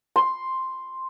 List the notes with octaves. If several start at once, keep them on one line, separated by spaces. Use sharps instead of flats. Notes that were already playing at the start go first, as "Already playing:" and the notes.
C6